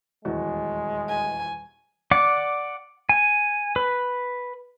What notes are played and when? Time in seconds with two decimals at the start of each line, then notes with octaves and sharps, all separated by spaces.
0.25 D#1 E2 G#3 F#4
1.09 G#5
2.11 D5 F#5 D6
3.09 G#5
3.76 B4